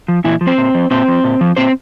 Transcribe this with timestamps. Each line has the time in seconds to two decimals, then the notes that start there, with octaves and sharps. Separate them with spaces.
0.08 F3
0.24 A#2 E3 E4
0.41 F3
0.47 C4 C5
0.58 A#2
0.75 F3
0.91 A#2 C4 C5
1.08 F3
1.24 A#2
1.41 F3
1.57 A#2 C4 C5